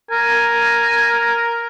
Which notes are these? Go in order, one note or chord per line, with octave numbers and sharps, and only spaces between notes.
A#4 G#5